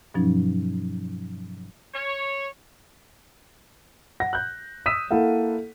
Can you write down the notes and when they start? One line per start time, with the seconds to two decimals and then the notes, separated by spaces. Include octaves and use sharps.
0.14 G2 B2 F3 F#3 C#4 D#4
1.94 C#5
4.20 F#5 A#6
4.33 F#6 G6
4.86 D#6 E6 B6 D#7 E7
5.11 A#3 E4 A4 F5 F#5